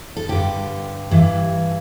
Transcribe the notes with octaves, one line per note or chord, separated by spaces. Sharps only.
A4
G2 D3 G4
G2 E3